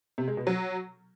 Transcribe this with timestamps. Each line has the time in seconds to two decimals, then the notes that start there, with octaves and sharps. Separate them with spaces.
0.18 C3
0.28 G#3
0.37 B2
0.47 F#3